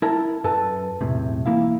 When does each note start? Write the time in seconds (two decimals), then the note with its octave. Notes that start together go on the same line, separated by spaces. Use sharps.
0.02 E4 A#4 A5
0.44 F#2 A4 B4 A5
1.01 B1 E2 A2 C3
1.46 E3 A#3 E4 F5